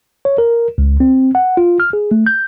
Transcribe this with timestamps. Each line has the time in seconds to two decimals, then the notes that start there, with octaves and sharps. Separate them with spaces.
0.25 C#5
0.38 A#4
0.78 C#2
1.00 C4
1.35 F#5
1.57 F4
1.80 F6
1.93 G#4
2.11 A3
2.27 G6